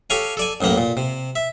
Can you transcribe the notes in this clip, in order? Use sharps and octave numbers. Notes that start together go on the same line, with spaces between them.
G4 A4 C#5 F5 G#5
A4 D5 G#5
A1 F#2 A2 A#3 A5
A#2
C3
E5